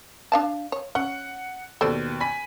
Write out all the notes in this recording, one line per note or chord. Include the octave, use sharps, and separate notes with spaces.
D4 F5 A5
C#5
C#4 F#5
D#2 B2 A4 C5 D5
G#5 B5 B6